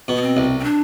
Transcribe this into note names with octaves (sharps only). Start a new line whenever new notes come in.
B2
B3
C4
C2
C4
D4